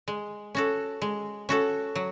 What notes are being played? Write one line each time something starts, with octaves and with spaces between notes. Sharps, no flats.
G#3
C#4 F#4 A4
G#3
C#4 F#4 A4
F#3